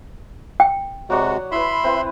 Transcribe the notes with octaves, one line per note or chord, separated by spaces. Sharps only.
G5
C3 F#3 G#3 F#4 D5 F#5
E4 B4 E5 B5 C6
C4 E4 B4